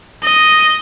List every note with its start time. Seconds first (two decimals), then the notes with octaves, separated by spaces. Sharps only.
0.23 D#5